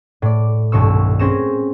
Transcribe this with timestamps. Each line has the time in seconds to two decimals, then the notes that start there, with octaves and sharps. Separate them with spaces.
0.22 A2 D5
0.72 D#1 B1 G2 B2 C#6 E6
1.19 C4 C#4 G#4 C#6 A#6 E7